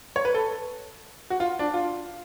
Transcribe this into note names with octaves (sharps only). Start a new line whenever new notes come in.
C#5
B4
A4
F#4
F4
D4
F4